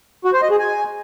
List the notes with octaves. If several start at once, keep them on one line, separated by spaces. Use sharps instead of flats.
F#4
C5
D#5
G#4
G#5